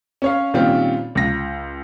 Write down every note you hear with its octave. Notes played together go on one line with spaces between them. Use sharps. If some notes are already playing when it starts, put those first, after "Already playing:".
C#4 C#5 F5
A#2 D#3 G3 C4 C#4 F4
C#2 A#6